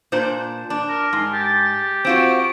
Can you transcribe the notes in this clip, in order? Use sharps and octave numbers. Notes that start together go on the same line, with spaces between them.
A#2 D4 C5
D4
A#4
G#2 C6
G4 A6
C4 F4 F#4 D7